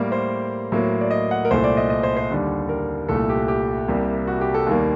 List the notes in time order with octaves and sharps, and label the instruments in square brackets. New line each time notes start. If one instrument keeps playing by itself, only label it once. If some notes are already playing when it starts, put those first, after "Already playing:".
Already playing: [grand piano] A2 G3 A#3 A#4
C5
A2 F#3 A#3
D5
D#5
F#5
A#4
C2 A#2 A3 C5
D5
D#5
D#5
C5
C5
D#2 D3 G3
A#4
C2 A#2 A3 A4
G4
G4
C2 C3 G3 A#3
F#4
G4
A4
D#2 D#3 G3 A#3